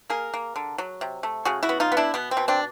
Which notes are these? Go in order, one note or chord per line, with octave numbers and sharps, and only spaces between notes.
A#3 G#4 A#4
A#3
D3
F#3
C3
A3
C#3 F#4 G#4
E4 F#4
B3
D#4 F4
B3
D4 E4
B2 B3
C4
B2
C4 D4